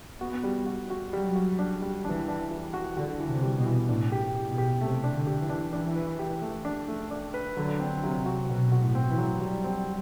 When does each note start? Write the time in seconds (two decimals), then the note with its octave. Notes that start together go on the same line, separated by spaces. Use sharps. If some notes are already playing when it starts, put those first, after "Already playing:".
0.21 B3 F#4
0.44 G3
0.66 F#4
0.90 F#4
1.13 F#3 G3
1.36 F#4
1.59 D4
1.82 G3
2.05 E3 D4
2.28 D4
2.51 E3
2.74 F#4
2.97 D3 F#4
3.20 E3
3.27 C3
3.43 G3
3.58 B2
3.66 E3
3.88 A2 D4
4.12 G4
4.20 B2
4.35 G4
4.50 B2
4.58 G4
4.81 C3 A3
5.04 D4
5.11 D3
5.27 G4
5.42 E3
5.50 D4
5.72 E3 D4
5.96 B4
6.19 G4
6.42 A3
6.65 D4
6.88 A3
7.11 D4
7.34 B4
7.57 D3 F#3
7.80 C4
8.02 C3 F#3
8.26 F#4
8.49 B2 F#3
8.72 F#4
8.80 A2
8.95 C4
9.10 E3
9.18 F#3
9.41 F#3 G3
9.64 C4